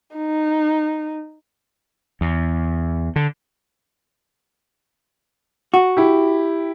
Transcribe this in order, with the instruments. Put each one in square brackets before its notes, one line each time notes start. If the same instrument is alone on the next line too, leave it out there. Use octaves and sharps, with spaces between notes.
[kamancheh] D#4
[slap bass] E2
D3
[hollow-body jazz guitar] F#4
[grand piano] E4 G4